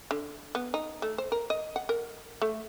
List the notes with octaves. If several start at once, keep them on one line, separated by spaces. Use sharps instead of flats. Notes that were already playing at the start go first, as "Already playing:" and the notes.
D3
B3
D#4
A3
C5
A#4
D#5
F#5
A#4
A3